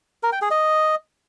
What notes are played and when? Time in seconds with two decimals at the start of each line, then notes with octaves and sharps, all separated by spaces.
0.23 A#4
0.32 G5
0.42 G#4
0.51 D#5